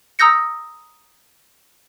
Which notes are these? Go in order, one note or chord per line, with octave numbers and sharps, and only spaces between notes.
A#5 D#6 E6 G6 A#6 C#7